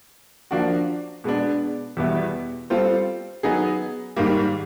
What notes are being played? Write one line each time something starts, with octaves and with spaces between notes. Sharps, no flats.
F3 A#3 D4 F#4
B2 G#3 B3 D4
E2 B2 G3 B3 E4
G3 C4 F4 A4 C5
F#3 B3 D#4 G#4
G#2 D#3 G3 A#3